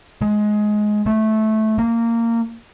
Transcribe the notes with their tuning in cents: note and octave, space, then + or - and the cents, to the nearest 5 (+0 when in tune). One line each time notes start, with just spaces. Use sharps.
G#3 +15
A3 -15
A#3 -15